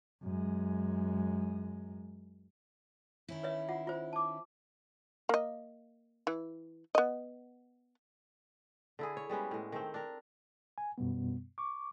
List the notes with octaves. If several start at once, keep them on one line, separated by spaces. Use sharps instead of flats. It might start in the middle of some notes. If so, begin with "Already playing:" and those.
F#2 G#3
D#3 C#4 E4
B4 C#5 E5
F4 F#5
F4 C5
A5 D6
A#3 D#5
E3
B3 D#5
D3 E4 G#4
C#5
G3 G#3 B3 C#4
A2 G#3
D#3 A3 C4
D4 A#4
G#5
F#2 B2 G3 B3
C#6 D6